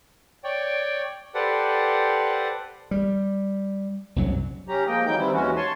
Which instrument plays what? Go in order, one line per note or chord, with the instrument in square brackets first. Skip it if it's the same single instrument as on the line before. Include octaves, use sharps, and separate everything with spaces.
[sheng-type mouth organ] C#5 D5 G5
G4 A4 B4 C5 D5 F#5
[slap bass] G3
C2 F#2 F#3
[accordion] C#4 G4 A#5
F3 G#3 A#3 D#5 G5
E3 F#3 D#4 G5 G6
D#3 E3 G3 C4 E4
D#2 E3 G#3 C#4 F#4
C#5 G#5 A5 C6